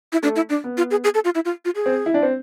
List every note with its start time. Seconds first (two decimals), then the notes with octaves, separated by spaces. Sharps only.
0.12 E4
0.23 A3 D4
0.36 E4
0.49 D4
0.64 B3
0.77 F4
0.91 G#4
1.04 G#4
1.14 A4
1.25 F4
1.35 E4
1.45 F4
1.65 F4
1.76 G#4
1.86 C4
2.06 E4
2.14 D4
2.23 C4